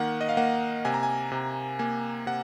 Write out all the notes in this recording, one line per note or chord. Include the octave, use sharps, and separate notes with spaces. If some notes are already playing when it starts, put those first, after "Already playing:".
Already playing: D#3 A#3 F#5
D#5
F5
A#3 F#5
C3 G#5
A#5
G#5
C3
A#3 G#5
C3 F#5